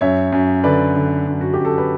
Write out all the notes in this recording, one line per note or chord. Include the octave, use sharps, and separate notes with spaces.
F#2 C#5 E5
F#2
D3 B4 D5
D3
F#2
F#4
F#2 G4
A4
B4